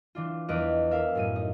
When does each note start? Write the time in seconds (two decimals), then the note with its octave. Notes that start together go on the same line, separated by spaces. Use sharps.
0.15 E3 D4 F4
0.48 E2 F3 B4 D#5 F6 D7
0.91 A#4 E5 F5
1.15 F#2 A2 D#7
1.36 D#4